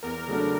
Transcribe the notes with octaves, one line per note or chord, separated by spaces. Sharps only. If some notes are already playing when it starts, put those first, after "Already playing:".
E2 A#4
C#3 F#3 A3 D4